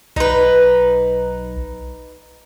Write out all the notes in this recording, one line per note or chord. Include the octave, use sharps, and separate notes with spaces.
B1 D#4 B4